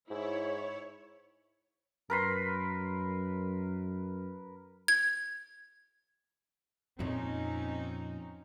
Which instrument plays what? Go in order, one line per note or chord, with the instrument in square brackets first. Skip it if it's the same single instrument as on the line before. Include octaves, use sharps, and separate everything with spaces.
[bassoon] G#2 [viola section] E4 [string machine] C#5
[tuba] F#2 [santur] A#4 B4 C6
[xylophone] G#6
[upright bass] F2 A#2 [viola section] C4 C#4 D#4